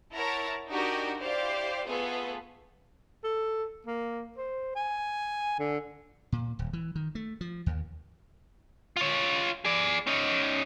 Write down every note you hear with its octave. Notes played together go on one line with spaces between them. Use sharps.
E4 A#4 C#5 F#5 A5 A#5
D4 D#4 F#4 G4 A#4
E4 G4 C5 D5 F5
A3 B3 F4 G#4 A4 B4
A4
A#3
C5
G#5
D3
A#2
D#1
E3
D#3
A3
F3
D#2
F4 C#5
G#4 D5
C#4 D#4